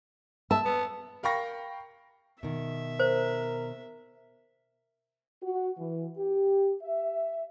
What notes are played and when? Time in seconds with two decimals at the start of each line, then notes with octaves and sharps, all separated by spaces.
0.51 E5 A5
0.65 B3
1.23 A#4 F5 G5 B5 C#6 A#6
2.43 B2 D#3 E5
3.00 A#4 C5
5.42 F#4
5.79 E3
6.18 G4
6.83 E5